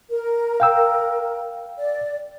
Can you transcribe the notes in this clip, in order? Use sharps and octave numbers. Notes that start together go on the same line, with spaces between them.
A#4
F5 G5 E6
D5